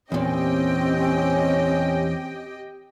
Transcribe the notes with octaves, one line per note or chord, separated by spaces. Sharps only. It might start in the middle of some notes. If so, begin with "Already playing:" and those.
E2 A#2 C4 C#4 G4 D#5 G5